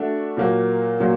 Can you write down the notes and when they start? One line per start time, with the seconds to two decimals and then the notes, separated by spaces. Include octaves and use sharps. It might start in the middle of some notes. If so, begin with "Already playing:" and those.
Already playing: A3 D4 F#4
0.37 A#2 F#3 A#3
1.00 A#2 F#3 A#3